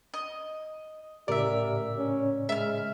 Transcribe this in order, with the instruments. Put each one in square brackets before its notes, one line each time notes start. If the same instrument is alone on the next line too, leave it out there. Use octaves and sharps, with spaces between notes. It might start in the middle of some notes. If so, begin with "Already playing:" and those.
[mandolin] D#5
[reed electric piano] A2 C#3 D5 [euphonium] G4 [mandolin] A#4 E5
[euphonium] C#4
[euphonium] G#3 [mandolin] E5 F6